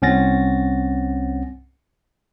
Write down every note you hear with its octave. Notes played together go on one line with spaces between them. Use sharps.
C2 C4 C#4 F#5 A6 A#6